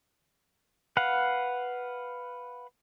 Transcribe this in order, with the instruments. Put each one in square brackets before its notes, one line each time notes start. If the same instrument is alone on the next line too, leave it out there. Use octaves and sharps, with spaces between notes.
[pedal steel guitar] B4 F5 F#5